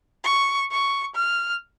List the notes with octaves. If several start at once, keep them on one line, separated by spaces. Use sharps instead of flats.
C#6
C#6
F6